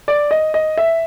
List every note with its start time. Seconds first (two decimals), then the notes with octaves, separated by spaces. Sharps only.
0.08 D5
0.31 D#5
0.54 D#5
0.78 E5